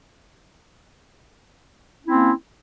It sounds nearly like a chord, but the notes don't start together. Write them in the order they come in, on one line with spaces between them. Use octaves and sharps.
C#4 E4 C4 A#3